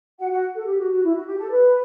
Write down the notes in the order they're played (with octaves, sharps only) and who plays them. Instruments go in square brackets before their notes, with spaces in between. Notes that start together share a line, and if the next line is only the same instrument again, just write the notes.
[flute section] F#4 F#5
F#4 F#5
A4
G4
F#4
F#4
E4
F#4
G4
A4
B4